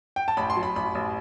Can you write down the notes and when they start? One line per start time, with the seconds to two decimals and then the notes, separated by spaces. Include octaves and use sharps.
0.16 G5
0.28 A5
0.37 A1 B5
0.50 C6
0.56 F#3
0.63 B5
0.76 A1 B5
0.95 A1